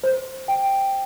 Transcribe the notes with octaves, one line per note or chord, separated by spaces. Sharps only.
C5
G5